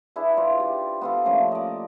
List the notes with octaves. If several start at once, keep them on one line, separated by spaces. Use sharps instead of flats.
D4 E4 G#4 B4
F4 C5 D5
G4
B3 F4 A4
F3 A3 A#3 C#4
D5 D#5